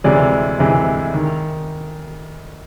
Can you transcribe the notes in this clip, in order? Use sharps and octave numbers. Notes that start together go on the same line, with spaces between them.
D2 C3 E3 G#3 D5
D2 C3 E3 G#3
D#3